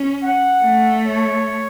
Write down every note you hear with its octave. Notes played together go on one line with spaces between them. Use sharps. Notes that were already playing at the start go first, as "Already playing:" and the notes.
Already playing: C#4
F#5
A3
C#5